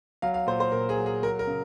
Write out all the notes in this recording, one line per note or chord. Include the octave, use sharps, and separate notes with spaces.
F#3 F5
F5
A#2 C5
C5
A#2 A#4
G#4
F#3
G#4
F#3 A#4
A#4
C#3